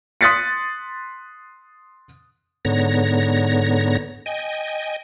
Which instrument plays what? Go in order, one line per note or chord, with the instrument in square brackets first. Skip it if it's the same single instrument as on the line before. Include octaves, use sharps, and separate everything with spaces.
[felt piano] C6 D#6 F#6 A6 B6 C#7
[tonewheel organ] G#2 D3 B3 C#5 A#5 A#6
D#5 G5 G#5